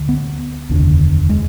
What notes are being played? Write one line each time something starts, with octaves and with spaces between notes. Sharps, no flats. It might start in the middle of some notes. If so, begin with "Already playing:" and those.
Already playing: D2 D3
B3
F1 D#2 D3
G#3